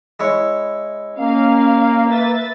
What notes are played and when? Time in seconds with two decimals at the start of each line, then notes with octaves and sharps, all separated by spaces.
0.20 G#3 E4 C#5
1.17 A#3 C#4 F5
2.09 B4 E5 A6